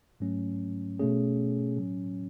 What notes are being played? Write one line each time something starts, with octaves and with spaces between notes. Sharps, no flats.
G#2 F#3 A3 C#4
B2 A3 C#4 G#4
A2 F#3 C#4